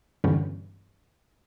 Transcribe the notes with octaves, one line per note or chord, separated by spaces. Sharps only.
G2 B2 D3 E3 G3 C#4